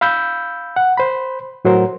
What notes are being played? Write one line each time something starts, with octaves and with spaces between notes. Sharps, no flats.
F5 B5 E6 G6
F#5
C5 B5
A2 F#3 A#4 C5